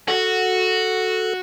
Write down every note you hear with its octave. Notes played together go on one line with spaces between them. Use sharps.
F#4 A4